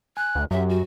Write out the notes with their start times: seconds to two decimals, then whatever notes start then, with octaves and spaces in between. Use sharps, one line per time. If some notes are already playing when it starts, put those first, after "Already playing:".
0.17 G#5 F#6
0.35 D2
0.51 F#2 F#3 G4 E5
0.69 F#4